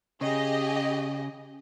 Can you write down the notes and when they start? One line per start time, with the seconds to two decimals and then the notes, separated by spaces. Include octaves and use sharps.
0.21 C#3 G4 G#4 D#5